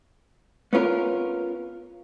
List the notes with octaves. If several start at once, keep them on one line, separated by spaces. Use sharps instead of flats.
B3 C#4 F4 A#4